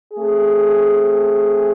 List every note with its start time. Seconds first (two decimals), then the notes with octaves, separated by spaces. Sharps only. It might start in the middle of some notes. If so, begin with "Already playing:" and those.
0.14 A3 C4 G#4